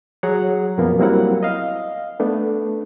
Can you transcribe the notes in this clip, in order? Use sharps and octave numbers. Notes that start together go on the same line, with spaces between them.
F#3 G#4 C#5 F#5 A#5
F#2 B2 F3 A#3 B3
F#3 G3 A#3 C4 E4 F#5
D#5 F5
A3 B3 D4